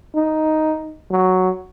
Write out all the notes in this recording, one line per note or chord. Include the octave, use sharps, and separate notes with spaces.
D#4
F#3